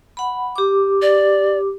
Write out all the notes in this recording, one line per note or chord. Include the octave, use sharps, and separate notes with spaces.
F#5 B5
G4 D6
D5